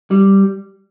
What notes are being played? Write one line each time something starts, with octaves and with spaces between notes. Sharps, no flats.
G3